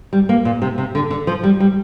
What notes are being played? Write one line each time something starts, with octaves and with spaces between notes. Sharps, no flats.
G3
A#3
A#2
C3
C3
D3
D3
F3
G3
G3